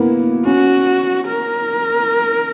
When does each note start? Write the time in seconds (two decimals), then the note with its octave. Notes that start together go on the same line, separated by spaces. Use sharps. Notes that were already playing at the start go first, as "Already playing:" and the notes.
Already playing: A#3 B3 E4
0.45 C#4 F#4
1.28 A#4